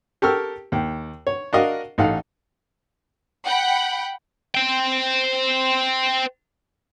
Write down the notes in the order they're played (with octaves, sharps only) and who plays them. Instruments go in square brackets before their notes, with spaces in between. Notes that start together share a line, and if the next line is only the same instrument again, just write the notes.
[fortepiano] G4 A4 A#4 C#6 E6 F6
D#2 G5
C#5
D4 F#4 A#4 D#5 F5
A1 D#4 A4 F5 F#5
[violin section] F#5 G5 B5
[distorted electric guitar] C5 G5